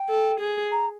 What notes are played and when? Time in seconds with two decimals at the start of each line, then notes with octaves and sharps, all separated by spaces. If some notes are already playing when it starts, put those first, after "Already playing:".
Already playing: G5
0.09 A4
0.40 G#4
0.71 A#5